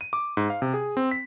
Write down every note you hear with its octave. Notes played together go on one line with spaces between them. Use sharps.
D#7
D6
G#2
F5
C3
G#4
C4
B6